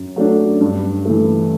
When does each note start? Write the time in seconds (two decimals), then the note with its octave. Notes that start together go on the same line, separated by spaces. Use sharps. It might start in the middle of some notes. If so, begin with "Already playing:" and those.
Already playing: F#2
0.16 F#3 A3 D4
0.61 G2
1.05 E3 A3